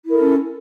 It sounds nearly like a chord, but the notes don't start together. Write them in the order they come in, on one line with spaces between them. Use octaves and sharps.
E4 A#4 A4 C#4